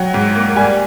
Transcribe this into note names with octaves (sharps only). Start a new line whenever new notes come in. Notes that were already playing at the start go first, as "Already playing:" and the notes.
Already playing: F#3 F#5 G5
G#2
A#3
G3 G#5